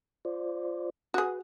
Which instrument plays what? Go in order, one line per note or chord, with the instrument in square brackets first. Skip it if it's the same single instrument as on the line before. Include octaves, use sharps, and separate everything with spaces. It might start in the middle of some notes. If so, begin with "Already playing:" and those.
[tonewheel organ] F4 C5 D5
[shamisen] F#4 G#4 [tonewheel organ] B4 F#5